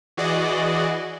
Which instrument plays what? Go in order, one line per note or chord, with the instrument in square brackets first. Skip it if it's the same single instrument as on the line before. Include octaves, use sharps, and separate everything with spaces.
[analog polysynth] E3 F#4 G#4 D5 D#5